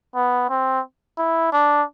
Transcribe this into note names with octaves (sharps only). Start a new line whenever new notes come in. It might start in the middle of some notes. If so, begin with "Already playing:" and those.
B3
C4
E4
D4